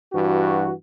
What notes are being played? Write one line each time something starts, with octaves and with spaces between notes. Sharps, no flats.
G2 E3 F#4